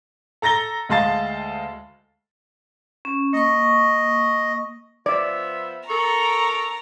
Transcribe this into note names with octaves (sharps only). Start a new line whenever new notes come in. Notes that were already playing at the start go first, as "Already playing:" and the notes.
A4 A#5 A6 A#6 G7
D2 G#3 F5 A5 A6
C#4
A#3 D#5 C#6
F3 B3 D5 E5
A4 A#4 A#5 C#6